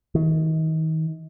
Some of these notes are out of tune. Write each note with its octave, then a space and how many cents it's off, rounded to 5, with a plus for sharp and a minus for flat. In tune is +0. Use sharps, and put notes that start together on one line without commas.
D#3 +35